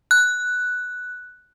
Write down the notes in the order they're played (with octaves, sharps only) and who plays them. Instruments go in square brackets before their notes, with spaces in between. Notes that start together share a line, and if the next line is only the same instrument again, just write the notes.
[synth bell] F#6